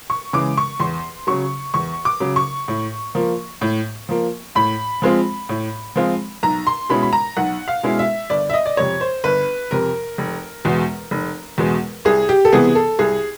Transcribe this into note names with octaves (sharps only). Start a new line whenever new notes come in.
C#6
C#3 E3 G#3 D6
C#6
E2 C6
C#3 F#3 C#6
E2 C#6
D6
C#3 F#3
C#6
A2
F3 A#3
A2
F3 A#3
A2 B5
F3 G#3 C4 F4
A2
F3 G#3 C4 F4
B1 A#5
C6
B2 G#3 C#4 E4 B5
B5
A#5
B1 F#5
F5
B2 G#3 C#4 E4
E5
G1 D5
E5
D#5
D5
F2 C3 C#5
C5
G1 B4
F2 C3 A#4
F1
E2 B2 G#3
F1
E2 B2 G#3
C2 G#4
G4
A4
C3 E3 G3 B3 G#4
A4
C2 G#4